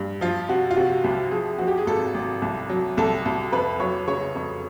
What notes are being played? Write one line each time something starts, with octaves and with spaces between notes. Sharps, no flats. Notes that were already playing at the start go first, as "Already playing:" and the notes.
Already playing: G2
F3 F4
C3 F#4
F4
C3 F#4
C2 G4
F3 G#4
F3 F#4
G4
G#4
G#1 A4
G#1
C2
F#3
C2 A4
C2
F2 B4
F#3 C#5
C#3 C#5
F2